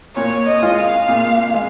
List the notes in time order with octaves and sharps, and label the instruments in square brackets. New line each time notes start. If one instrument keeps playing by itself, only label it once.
[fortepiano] A#2 [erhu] C#5
[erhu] D#5
[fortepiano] G#3 F4
[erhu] F5
[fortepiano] A#2
G#3